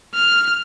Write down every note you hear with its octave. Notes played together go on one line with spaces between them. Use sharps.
F6